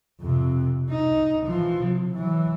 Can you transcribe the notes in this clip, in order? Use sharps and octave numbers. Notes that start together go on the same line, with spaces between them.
F2 C3
D#4
E3 F3
C3
E3 F#3